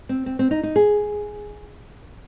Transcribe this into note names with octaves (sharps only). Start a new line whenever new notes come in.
C4
C4
C4
D#4
D#4
G#4